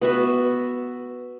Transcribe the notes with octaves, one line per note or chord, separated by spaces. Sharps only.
B3 F#4 E5